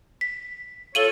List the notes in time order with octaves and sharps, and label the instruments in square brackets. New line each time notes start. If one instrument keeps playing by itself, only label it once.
[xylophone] B6
[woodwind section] F4 A4 C#5 [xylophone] D#7 F#7 G7